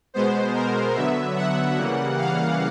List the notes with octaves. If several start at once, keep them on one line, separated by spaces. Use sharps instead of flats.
B2 G#3 B3 C5
A#4
D3 F#3 B3 E5
F#5
C#3 E3 G3 A#3
F5